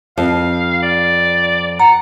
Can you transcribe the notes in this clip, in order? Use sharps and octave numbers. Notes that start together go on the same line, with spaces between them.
F2 F5
D5
F#5 A#5